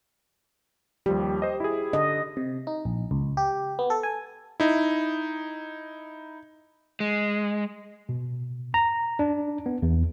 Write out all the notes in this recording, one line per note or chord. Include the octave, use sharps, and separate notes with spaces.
D#2 F3 G3 G4
C5 D#5
E4 G#4
D3 D#5
C3
D#4
A#1
C#2
G4
B3
A4
G#5
D#4 E4
G#3
B2
A#5
D4
B3
E2